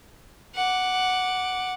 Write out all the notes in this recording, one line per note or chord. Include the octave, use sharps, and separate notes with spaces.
F#5 D6